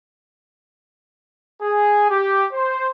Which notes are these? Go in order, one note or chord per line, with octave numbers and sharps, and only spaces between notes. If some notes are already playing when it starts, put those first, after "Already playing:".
G#4
G4
C5